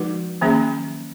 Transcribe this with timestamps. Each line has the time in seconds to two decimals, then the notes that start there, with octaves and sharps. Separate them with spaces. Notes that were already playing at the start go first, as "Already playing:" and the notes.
Already playing: F3 G#3 D#4 F#4 B4
0.41 D#3 F#3 A#3 C#4 G#4